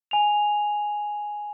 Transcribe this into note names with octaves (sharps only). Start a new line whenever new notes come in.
G#5 F7